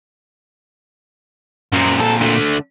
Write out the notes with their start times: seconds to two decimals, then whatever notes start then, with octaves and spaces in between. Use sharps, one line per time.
1.73 F#2 A#2 C4
2.00 A4
2.21 D3 A3